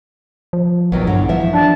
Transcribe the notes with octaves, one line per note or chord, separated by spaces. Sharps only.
F3
A#1 E2 D#3 F#3
G2 D3 F#3
E3 F3 E5
D4 A5